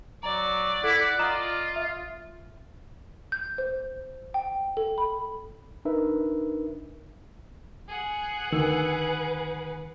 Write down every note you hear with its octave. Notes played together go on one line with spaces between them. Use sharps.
F#3 D5 A#5
E4 A4 F#5
F4 D#5 A#5 E7
E5
G6
C5
G5
A4
B5
D4 D#4 A#4 B4 E5
G#4 F#5
D2 D#3 B4 E6